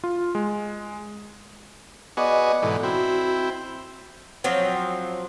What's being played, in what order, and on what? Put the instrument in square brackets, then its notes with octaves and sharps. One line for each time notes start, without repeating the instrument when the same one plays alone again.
[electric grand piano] F4
G#3
[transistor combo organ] B3 F#4 G#4 [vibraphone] D5 D#5 D6
[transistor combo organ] G#2 B2 E3 [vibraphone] A4
[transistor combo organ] C4 E4 [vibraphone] F#4
[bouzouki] F3 F#3 C4